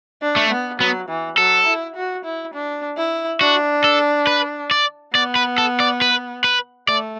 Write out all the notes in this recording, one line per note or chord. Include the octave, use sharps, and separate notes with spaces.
D4
A3
B3
F#3 B3
E3
F#3 A4
E4
F#4
E4
D4
E4
D4 F#4
A4
B4
D5
B3 D5
B4
A4
D5
B4
B4
A3 D5